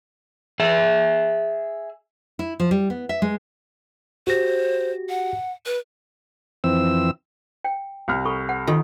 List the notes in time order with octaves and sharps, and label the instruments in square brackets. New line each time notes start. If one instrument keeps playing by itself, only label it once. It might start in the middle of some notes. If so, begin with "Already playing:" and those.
[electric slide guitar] G#4 E5
[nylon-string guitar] E4
F3
G3
B3
E5
G#3
[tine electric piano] F#4 G4 A#6 [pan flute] C5
[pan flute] F#5
B4
[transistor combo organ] F2 E3 C4 E6
[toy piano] G5
[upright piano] C2 F6
[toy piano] A4 B5 C#6
F#5
[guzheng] D#3 [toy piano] F4 A4 D#5